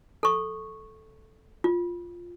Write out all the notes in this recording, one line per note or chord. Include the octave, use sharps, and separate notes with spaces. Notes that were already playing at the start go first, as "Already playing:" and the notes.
A4 C#6
F4